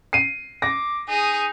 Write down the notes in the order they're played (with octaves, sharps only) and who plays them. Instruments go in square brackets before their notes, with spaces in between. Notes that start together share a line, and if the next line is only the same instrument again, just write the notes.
[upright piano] C7 D#7
[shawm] D6 [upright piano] A#6
[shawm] D#4 [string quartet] G#4